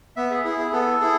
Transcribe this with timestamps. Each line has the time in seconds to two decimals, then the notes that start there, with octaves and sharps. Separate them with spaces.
0.17 B3 E5
0.30 G#4
0.44 E4 G#4
0.59 G#4
0.72 B3 A4
1.00 E4 G#4